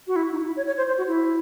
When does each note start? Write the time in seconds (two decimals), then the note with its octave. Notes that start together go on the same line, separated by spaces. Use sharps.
0.07 F#4
0.16 E4
0.32 D#4
0.46 E4
0.57 C#5
0.67 C#5
0.77 C5
0.87 C5
0.98 F#4
1.08 E4